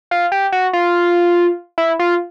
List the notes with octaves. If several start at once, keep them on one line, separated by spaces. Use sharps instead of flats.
F4
G4
F#4
F4
E4
F4